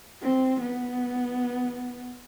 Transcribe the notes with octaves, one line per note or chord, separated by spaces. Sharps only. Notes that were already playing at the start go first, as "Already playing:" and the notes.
C4
B3